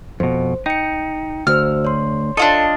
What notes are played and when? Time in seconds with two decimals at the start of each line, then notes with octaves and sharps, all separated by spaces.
0.20 F2 B2 C5
0.66 D#4 G5 C#7
1.47 D2 F#4 C5 E6 F6
1.85 C#5 C6
2.37 D4 F4 A4 D#5